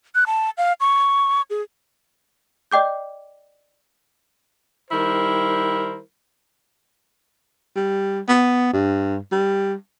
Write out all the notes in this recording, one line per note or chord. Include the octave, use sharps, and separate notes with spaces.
F#6
A5
F5
C#6
G#4
D5 D#5 G5 D6 G6
D#3 G3 E4 A#4 C5
G3
B3
G2
G3